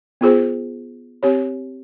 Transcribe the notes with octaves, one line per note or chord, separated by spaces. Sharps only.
B3 F4 G#4 C5
C4 G4 C#5